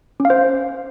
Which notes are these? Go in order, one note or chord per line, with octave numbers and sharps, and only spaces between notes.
C#4
F5
C5